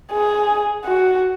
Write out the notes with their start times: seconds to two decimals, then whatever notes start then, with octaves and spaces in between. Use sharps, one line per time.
0.12 G#4
0.85 F#4